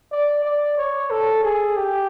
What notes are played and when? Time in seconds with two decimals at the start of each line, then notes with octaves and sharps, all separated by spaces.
0.12 D5
0.45 D5
0.77 C#5
1.10 A4
1.43 G#4
1.76 G4